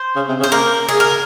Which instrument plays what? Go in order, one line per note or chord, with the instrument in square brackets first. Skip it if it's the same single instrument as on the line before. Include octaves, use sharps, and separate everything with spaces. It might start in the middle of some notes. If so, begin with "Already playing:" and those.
Already playing: [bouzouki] C5
[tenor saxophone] C#3
C3
C#3
[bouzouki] C5
[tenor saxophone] A#3 [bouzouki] A#4
[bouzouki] G#4
A#4